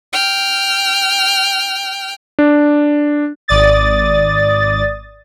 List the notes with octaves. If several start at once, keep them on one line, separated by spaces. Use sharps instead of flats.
G5 F6
D4
G#1 D5 D#6 A6